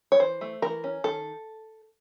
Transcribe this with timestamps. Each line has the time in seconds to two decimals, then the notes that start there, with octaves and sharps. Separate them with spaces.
0.12 C#5
0.19 E3 C5
0.41 A3
0.62 E3 A#4
0.84 C#4
1.04 D#3 A4